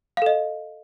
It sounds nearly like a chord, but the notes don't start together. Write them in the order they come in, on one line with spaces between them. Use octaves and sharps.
F5 A4 D#5